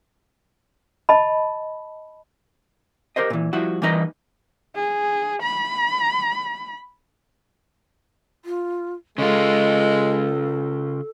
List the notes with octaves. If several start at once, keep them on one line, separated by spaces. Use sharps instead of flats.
D#5 A5 B5
G4 A#4 C5 D#5
A#2 E3
F3 G3 E4 F#4
E3 G3 A#3 D#4 B4 D#5
G#4
B5
F4
C#3 G#3 F4 A4